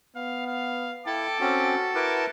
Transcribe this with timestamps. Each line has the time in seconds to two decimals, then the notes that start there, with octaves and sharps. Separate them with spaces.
0.16 B3 F5
0.46 F5
1.06 E4 A4 G5 A5 D6
1.40 C4 C#4 F#4
1.95 E4 A#4 B4 D6